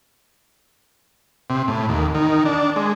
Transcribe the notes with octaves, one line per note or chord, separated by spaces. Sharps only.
C3
A2
D#2
D#3
D4
G#3